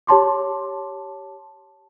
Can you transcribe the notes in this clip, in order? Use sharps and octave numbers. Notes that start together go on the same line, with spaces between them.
G4 C#5 A5 C6 D6